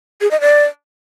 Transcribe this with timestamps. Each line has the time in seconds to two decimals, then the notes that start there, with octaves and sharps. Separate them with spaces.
0.21 G#4
0.31 D#5
0.41 D5